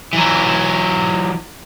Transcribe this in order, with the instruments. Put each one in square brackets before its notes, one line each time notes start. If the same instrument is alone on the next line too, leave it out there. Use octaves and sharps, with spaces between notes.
[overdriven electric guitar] E3 F#3